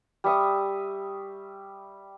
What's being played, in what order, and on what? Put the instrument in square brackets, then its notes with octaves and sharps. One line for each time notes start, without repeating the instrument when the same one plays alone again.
[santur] G3 E5 C#6 D#6